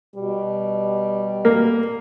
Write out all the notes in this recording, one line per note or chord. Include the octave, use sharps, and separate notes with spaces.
B2 G3
A#3